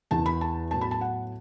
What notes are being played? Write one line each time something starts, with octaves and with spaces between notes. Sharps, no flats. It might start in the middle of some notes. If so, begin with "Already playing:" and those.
E2 E3 B3 A5
B5
A5
A2 F#3 B3 A5
B5
A5
F#5